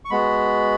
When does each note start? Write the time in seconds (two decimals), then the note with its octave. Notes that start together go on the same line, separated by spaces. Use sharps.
0.05 C#6
0.10 G#3 B3 F#4 B5